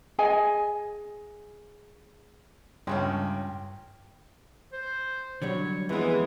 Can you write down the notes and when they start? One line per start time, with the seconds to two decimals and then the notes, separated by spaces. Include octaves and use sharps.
0.19 G#4 D#5 G#5
2.87 C#2 G2 G#3 A3 C#4 G5
4.73 C5
5.42 D3 F#3 G3 C#5
5.89 F2 E3 G#3 B3 G#4